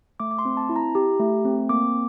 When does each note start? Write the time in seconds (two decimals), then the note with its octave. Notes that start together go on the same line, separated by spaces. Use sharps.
0.20 A3 D6
0.31 D6
0.39 C6
0.45 C4
0.57 A5
0.69 E4
0.76 A#5
0.95 G4
1.20 A3
1.45 C4
1.69 A#3 D6